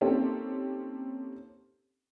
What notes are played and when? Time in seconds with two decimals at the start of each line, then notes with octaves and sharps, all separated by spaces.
0.01 A#3 C4 C#4 D#4 G4 A4